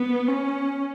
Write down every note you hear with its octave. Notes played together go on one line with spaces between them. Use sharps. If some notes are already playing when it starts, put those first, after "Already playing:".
Already playing: B3
C#4